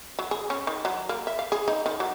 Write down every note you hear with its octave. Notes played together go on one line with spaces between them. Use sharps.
F#3
G#4
C#4
D#3
F#3
A#3
E5
F5
G#4
D#4
D#3
F#3